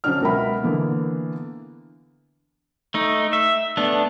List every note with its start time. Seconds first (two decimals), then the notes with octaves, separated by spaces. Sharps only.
0.04 C#3 F#3 C4 D4 F6
0.21 C#2 B2 A#4 E5 F#5 B5
0.63 D3 E3 A#3 B3
2.94 A3 D#4
3.33 E5
3.77 A3 B3 D4